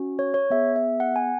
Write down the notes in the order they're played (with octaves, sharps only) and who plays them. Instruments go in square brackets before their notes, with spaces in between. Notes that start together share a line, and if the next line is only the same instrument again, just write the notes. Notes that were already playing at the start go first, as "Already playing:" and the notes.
Already playing: [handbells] C#4 F#4
C#5
C#5
B3 G#4 E5
E5
F#5
G#5